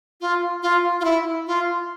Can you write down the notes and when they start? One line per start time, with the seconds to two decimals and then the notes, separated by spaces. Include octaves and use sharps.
0.21 F4
0.63 F4
1.00 F4
1.05 E4
1.47 F4